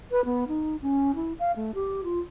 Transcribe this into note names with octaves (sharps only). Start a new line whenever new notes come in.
B4
B3
D#4
C#4
E4
F5
A3
G4
F4